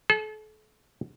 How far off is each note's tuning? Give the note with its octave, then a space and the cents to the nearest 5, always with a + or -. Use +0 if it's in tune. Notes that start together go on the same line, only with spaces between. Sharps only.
A4 -40